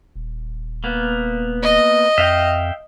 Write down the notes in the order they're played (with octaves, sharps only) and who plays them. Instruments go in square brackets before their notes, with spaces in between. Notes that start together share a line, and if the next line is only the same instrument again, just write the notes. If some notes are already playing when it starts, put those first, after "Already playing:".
[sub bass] D#1
[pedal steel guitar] A#3 B3
[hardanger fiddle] D#5
[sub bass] F2 [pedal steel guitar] E5 F5 G5